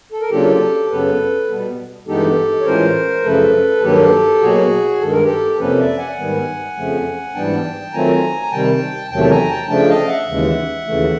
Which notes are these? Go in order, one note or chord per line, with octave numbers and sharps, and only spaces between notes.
A4
A#4
C#3 F#3 A#3 D4 F4 G4 A4
F#2 C#3 F#3 B3 A4 B4
B2 G3 B3
G2 E3 G#3 B3 D#4 G4 A4
C#5
A2 E3 G#3 C#4 F4 A#4 C5
F#2 C#3 F3 A3 A4 B4
G2 D#3 F#3 A#3 G4 A4
B2 F#3 A#3 F#4 G#4
G2 D#3 G#3 A4
A#4
G4 A4
F2 C3 F3 A#3 C#4 A4 B4
D5 E5
F#5 G#5
G#2 D#3 G3 B3
F2 C#3 F3 A3
G#2 E3 G3 B3 D4 G5 A5
D#3 F#3 A3 C4 F4 G#5 A#5
A#5
C3 D#3 G3 G5 A5
E2 C3 D#3 F#3 A3 G5 A5
A5
G#5 A#5
G5 A5
C#3 F3 A3 D4 G5 A5
D#5 F5
E5 F#5
D#2 C#3 E3 G#3
D#2 C#3 E3 A3